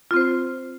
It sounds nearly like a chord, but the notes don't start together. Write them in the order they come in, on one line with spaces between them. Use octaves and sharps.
F4 C4 C5